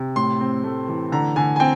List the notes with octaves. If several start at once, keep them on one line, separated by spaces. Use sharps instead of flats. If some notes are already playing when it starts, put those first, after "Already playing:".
Already playing: C3
A2 C6
C4
A3
E3
D3 A#5
D3 G#5
G#5
C4 G5